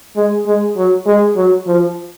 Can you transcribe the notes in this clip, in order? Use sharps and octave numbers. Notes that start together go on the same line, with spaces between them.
G#3
G#3
F#3
G#3
F#3
F3